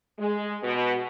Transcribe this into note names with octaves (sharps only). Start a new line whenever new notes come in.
G#3
B2